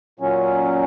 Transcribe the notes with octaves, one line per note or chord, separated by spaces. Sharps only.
A#2 F#3 C#4